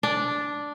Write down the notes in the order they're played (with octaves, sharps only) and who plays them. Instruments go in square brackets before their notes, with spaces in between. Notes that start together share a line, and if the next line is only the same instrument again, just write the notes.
[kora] D4